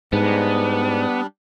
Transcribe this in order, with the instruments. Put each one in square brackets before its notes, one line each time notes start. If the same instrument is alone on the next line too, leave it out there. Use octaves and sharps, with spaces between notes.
[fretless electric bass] G#2 [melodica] G3 D4 [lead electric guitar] B3